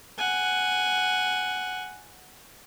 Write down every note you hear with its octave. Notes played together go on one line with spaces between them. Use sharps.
F#5 G#5